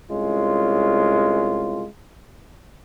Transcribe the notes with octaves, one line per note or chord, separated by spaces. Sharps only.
C2 G#3 C#4 F4